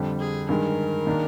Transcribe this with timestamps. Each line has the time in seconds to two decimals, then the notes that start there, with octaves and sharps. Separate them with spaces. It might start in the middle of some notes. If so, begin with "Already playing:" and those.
Already playing: F2 D3 G3
0.19 G#4
0.49 G2 D#3 G#3 A#4
1.07 D#3 A#3 D4 G#4